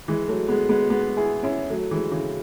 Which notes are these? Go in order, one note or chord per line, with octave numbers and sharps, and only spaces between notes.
E3 G#3
F#3 A3
G#3 B3
G#3 B3
G#3 B3
E4 G#4
C#4 E4
F#3 A3
E3 G#3
C#3 E3